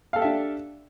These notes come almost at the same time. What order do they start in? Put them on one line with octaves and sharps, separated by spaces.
F5 A4 G4 E5 D4